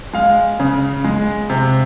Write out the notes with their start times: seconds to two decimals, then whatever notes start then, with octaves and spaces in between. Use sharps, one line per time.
0.13 G#3 F5
0.60 C#3
1.04 G#3
1.50 C3